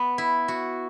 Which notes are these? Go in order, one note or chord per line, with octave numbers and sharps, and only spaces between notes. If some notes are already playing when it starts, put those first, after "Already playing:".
Already playing: B3
E4
F#4